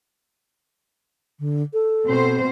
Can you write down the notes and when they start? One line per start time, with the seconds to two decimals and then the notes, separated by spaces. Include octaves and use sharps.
1.39 D3
1.73 A4
2.06 B2 C4 C5